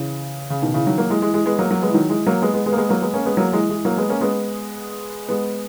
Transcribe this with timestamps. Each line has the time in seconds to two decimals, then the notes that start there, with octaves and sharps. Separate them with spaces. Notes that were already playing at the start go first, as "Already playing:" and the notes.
Already playing: C#3 E3
0.50 C#3
0.62 B2 D#3
0.74 C#3 E3
0.86 D#3 F#3
0.98 F#3 A#3
1.10 E3 G#3
1.22 E3 G#3
1.34 E3 G#3
1.46 G#3 B3
1.59 F#3 A#3
1.70 F#3 A#3
1.82 G#3 B3
1.90 E3
1.94 D#3 F#3
2.09 E3 G#3
2.26 F#3 A#3
2.42 G#3 B3
2.54 G#3 B3
2.66 G#3 B3
2.72 A#3
2.77 G#3 B3
2.89 F#3 A#3
3.01 G#3 B3
3.14 A#3 C#4
3.26 G#3 B3
3.37 F#3 A#3
3.53 E3 G#3
3.69 E3 G#3
3.85 F#3 A#3
3.97 G#3 B3
4.09 A#3 C#4
4.21 G#3 B3
5.28 G#3 B3